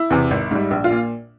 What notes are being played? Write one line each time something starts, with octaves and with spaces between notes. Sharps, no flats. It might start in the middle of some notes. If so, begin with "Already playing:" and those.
Already playing: E4
E2 C3
G#1
G#2 G3
A#1
F4
A#2